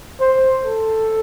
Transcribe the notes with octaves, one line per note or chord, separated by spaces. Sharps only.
C5
A4